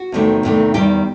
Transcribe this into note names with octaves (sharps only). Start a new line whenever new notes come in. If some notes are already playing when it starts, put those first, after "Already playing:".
Already playing: F#4
E2 C3 D#3 A3
E2 C3 D#3 A3
E2 D#3 G3 G4